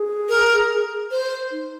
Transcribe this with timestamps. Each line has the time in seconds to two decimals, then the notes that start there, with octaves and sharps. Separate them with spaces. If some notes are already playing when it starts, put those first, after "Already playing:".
Already playing: G#4
0.29 A#4
1.11 C5
1.51 D#4